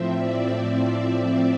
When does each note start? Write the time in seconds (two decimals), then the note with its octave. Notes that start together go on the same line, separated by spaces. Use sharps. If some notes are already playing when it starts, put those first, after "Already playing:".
Already playing: A2 F3 C4 E5
0.14 D5